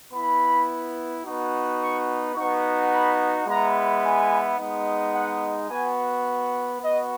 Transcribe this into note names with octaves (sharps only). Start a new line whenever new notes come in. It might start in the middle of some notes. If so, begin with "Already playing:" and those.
B3 E4 B5
B3 D#4 F#4
C#6
B3 D#4 F#4 C#6
B5
G#3 B3 E4 A#5
G#5
G#3 B3 D#4
F#5
B3 F#4 G#5
B3 F#4 D#5